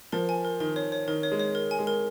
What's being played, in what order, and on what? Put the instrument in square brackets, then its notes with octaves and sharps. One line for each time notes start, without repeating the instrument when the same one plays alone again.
[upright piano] F3 [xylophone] A#4
[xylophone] G#5
A#4
[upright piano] D#3 [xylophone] A#4
[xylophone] C#5
C#5
[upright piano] D#3 [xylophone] A#4
[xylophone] C#5
[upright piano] G#3
[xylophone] C#5
A#4
G#5
[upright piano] G#3
[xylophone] A#4